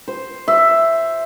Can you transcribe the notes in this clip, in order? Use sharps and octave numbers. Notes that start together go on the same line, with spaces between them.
C5
E5